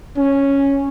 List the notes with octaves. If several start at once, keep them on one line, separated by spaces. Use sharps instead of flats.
C#4